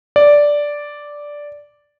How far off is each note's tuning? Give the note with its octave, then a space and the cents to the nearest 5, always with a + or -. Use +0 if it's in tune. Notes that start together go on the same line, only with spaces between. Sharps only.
D5 -5